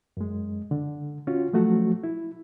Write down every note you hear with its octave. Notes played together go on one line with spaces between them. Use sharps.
F#2 G#3
D3
C#4 F4 F#4
F3 F#3 A3 F#4
E4